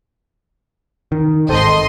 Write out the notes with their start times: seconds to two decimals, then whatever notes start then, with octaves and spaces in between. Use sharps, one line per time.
1.12 D#3
1.49 D1 G#1 A4 C5 D#5 G5 C6